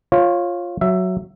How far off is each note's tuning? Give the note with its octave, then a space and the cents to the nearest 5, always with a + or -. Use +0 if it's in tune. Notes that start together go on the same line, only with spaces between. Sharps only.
F4 +0 C#5 -20
F#3 +0 E5 +15